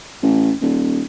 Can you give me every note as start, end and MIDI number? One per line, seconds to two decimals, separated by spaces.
0.22 0.52 33
0.62 1.02 27